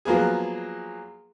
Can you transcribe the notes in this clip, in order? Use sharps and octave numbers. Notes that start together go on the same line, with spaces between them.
F3 F#3 A#3 B3 G#4